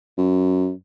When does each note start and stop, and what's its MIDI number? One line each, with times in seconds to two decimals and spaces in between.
0.18 0.72 42